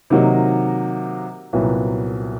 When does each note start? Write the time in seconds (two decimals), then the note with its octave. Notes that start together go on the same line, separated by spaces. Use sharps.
0.10 C3 D#3 F#3 A#3 D#4
1.53 C2 A#2 F#3 B3